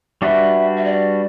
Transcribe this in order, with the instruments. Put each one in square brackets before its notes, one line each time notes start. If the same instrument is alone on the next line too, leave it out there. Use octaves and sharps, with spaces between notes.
[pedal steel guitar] G3 D4 F#4 B4 [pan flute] E5
[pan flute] E5
D5